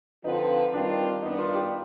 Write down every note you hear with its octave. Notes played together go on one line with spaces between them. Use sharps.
D3 F3 C4 D#4 F4 B4
D#3 G3 C4 D4 F4
G2 D#3 B3 D4 D#4
F4
G4